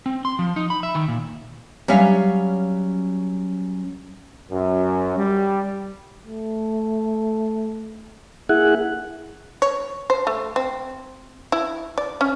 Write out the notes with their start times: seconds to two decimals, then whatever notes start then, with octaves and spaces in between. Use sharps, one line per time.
0.06 C4
0.25 C6
0.39 F3
0.56 D#4
0.70 B5
0.83 E5
0.95 D#3
1.08 A#2
1.88 F#3 G3 C#4 E5 F5
4.51 F#2
5.17 G3
6.24 A3
8.49 A#3 E4 G#4 F#5
9.62 C#5
10.10 C5
10.27 A3
10.56 C4
11.52 E4
11.98 D5
12.21 C#4